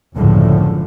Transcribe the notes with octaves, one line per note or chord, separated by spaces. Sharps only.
F#1 C#2 A2 D3 F3